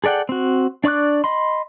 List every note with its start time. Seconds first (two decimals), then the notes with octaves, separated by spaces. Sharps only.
0.04 G#4 A4 D5 F#5 G5
0.29 C4 F#4
0.84 D4 D5 C#6 D6 F#6
1.24 D#5 B5 C6